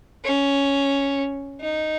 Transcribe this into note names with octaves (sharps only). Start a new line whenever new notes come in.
C#4
D#4